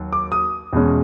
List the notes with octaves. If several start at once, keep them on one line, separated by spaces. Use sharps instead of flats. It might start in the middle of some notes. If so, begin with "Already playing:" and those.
Already playing: D#2 F#3
D6
D#6
E2 B2 G#3 C#4